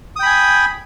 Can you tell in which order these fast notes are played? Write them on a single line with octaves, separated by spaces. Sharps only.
D#6 G5 B5 G#5